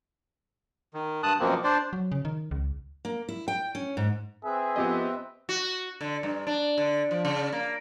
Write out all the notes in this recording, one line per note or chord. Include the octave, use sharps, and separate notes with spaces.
D#3
G2 A5 D#6 F#6
F#2 B2 F3 A#3 C4
D4 C5 D5
F#3
C#3
D#3
C#2
A#3
E4
G5
C#4
G#2
C4 G#4 B4 E5
F2 B3 G4 D#5
F#4
D3
G2
D4
D3
F3
C#3
A#3